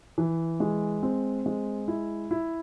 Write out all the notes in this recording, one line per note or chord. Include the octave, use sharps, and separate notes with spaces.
E3
G#3
C4
G#3
E4
E4